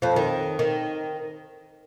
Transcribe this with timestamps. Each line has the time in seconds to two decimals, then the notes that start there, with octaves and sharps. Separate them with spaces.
0.02 F2 F3
0.16 D#3
0.59 D#3